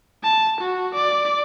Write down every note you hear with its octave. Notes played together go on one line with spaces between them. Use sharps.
A5
F#4
D5